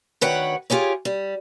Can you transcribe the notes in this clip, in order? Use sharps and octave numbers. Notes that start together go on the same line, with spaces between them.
D2 D#3 B4 C#5 F#5 G5
F4 G4 G#4 C#5
G3